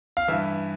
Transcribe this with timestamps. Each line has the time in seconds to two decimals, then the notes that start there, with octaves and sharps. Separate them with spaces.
0.17 F5
0.28 G2 E3 E5